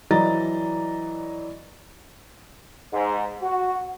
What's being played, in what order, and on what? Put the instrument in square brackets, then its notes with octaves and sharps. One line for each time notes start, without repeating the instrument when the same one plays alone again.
[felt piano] E3 F#3 D5 D#5 A#5 A6
[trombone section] G#2
F#4